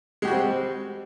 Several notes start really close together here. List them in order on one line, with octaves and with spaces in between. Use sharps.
G#3 G4 F#4 G3 C4